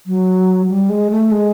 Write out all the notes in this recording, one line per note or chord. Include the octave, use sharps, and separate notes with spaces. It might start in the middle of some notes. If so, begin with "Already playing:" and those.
F#3
G3
G#3
A3
G#3